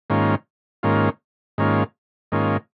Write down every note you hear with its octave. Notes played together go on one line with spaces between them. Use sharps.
G#2 D#3 A#3 C#4 F4
G#2 D#3 A#3 C#4 F4
G#2 D#3 A#3 C#4 F4
G#2 D#3 A#3 C#4 F4